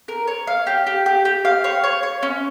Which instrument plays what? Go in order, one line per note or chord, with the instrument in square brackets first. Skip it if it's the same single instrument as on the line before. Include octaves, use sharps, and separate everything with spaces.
[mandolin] A#4
C#5
F5
G4
G4
G4
G4
F5
C#5
C#5
C#5
C#4